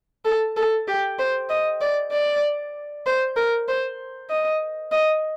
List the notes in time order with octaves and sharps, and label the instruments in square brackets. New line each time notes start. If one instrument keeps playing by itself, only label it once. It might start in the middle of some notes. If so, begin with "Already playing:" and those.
[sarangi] A4
A4
G4
C5
D#5
D5
D5
C5
A#4
C5
D#5
D#5